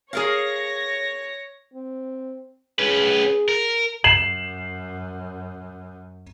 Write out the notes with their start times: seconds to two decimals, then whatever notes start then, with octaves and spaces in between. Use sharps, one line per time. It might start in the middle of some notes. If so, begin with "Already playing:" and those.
0.13 G#4 A#4 C#5 F5 A#6
1.74 C4
2.79 C#4 G#4 B4
3.49 A#4
4.04 F#2 C7 E7 F#7